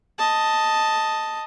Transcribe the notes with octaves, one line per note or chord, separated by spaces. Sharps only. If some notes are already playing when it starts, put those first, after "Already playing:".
D#5 A5